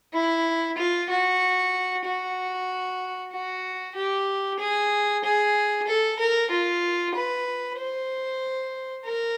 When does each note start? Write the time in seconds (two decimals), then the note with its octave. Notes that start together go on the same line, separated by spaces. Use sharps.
0.14 E4
0.78 F4
1.10 F#4
2.05 F#4
3.32 F#4
3.95 G4
4.60 G#4
5.24 G#4
5.88 A4
6.19 A#4
6.51 F4
7.15 B4
7.79 C5
9.06 A#4